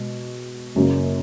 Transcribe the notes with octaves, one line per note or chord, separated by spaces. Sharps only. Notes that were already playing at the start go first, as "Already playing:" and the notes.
Already playing: B2 G#3
F#1 F#2 C#3 F#3 A#3